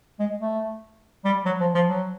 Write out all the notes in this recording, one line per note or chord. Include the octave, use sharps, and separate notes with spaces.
G#3
A3
G3
F#3
F3
F3
F#3